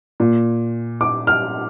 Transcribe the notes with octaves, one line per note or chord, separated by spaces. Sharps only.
A#2
D6
F6